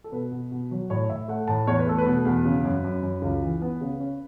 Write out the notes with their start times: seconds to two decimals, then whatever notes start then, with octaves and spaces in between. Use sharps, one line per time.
0.04 A4
0.12 B2 B4
0.31 B2
0.51 B2
0.71 F#3
0.90 A2 C#5
1.09 A2 E5
1.28 A3 F#5
1.48 A2 A5
1.67 E2 C#5
1.79 B4
1.87 A3 A4
1.98 B4
2.06 B2
2.25 E2
2.45 C#3
2.64 F#2
2.84 F#2
3.03 F#2
3.22 C#2
3.43 E3
3.62 B3
3.81 C#3
4.00 C#4